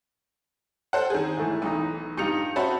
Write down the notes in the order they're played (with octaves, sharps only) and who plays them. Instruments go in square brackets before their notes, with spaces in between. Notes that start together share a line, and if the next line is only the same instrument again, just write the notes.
[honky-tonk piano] A4 C5 F#5
D#3 G#4
[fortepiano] G#2 E3 A3
[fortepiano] B1 D#4 [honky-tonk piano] E3
[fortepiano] G2 D#4 F4 [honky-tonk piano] G4 C#7 F7
[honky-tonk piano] C#4 F#4 C5 [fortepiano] E5 A5 B5